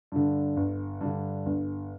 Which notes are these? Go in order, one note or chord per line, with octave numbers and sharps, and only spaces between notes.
G2 D3
G1
G2 D3
G1